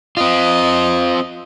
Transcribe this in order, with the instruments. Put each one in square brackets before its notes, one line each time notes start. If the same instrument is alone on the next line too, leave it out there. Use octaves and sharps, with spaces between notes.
[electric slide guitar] C4 F4 [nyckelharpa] D#5